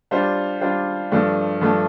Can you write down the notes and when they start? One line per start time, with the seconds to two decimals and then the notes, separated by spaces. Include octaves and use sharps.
0.11 G3 D4 F4 C5
0.61 G3 D4 F4 C5
1.12 G2 F3 A3 D4
1.61 G2 F3 A3 D4